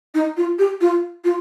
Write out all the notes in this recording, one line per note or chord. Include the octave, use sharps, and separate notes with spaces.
D#4
F4
G4
F4
F4